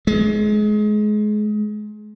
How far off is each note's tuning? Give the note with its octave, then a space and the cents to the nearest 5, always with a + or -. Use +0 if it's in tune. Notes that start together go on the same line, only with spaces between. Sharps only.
G#3 +25